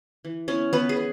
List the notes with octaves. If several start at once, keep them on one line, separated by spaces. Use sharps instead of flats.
E3
B3 C#4 E4 C#5
E3 B3 B4
G#4
B3